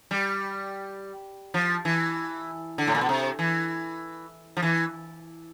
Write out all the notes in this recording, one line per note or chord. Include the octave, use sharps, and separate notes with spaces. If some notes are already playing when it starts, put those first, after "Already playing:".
G3
F3
E3
D3
A2
A#2
B2
C3
E3
F3
E3